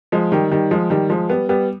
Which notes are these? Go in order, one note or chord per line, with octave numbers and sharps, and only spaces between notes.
F3 G#3
D#3 G3
D#3 G3
F3 G#3
D#3 G3
F3 G#3
G3 B3
G3 B3